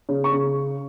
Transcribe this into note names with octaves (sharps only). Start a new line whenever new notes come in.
C#3
C#6
C#3